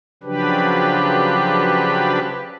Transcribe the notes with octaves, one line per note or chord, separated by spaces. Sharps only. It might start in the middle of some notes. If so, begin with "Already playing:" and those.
C#3 F3 F#3 D4 G4 B4